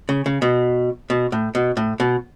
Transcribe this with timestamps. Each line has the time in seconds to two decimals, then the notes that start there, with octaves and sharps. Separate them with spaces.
0.09 C#3
0.26 C#3
0.42 B2
1.10 B2
1.32 A2
1.55 B2
1.77 A2
2.00 B2